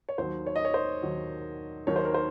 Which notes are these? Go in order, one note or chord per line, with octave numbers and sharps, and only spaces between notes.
C#5
D#2 D#3 F#3 C5
C#5
D#5
C#5
C5
D#2 D#3 F#3
D#2 D#3 F#3 C#5
C5
A#4
C5